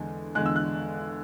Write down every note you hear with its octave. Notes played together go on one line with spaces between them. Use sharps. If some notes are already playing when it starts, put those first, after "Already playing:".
Already playing: E2 D3 G#3
E2 D3 G#3 F#6
E6
F#6